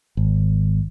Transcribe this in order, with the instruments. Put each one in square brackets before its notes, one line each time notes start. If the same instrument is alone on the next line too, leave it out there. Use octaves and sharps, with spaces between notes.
[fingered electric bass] G#1